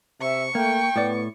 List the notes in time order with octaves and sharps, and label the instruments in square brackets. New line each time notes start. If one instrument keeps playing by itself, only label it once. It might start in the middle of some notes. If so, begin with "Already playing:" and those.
[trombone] C3 [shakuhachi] E5 [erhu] C#6
[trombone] A3 [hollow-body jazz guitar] A#3 [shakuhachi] G5
[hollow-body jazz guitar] A2 D5 [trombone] B3